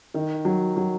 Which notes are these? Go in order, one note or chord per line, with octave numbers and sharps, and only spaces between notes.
D#3
F#3
F#3